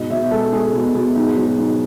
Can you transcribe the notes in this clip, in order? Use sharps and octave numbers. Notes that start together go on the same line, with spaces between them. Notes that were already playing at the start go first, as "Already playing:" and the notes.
Already playing: G#2 B2 D#5
B2 E5
G#3 A4
G#3 G#4
B2
B2
G#2
F#3
G#2